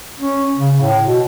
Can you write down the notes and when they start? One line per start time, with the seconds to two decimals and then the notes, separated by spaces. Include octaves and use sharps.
0.20 C#4
0.58 C#3
0.81 A2
1.05 B2